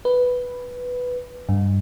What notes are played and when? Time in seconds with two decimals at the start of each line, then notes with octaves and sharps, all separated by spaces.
0.05 B4
1.49 G2